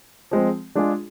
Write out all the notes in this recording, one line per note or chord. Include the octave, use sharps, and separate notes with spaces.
F3 G#3 C4
G#3 D4 F4 G#4